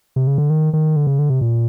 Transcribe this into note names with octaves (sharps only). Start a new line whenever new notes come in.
C3
C#3
D3
D#3
D#3
D3
C#3
D3
C3
A#2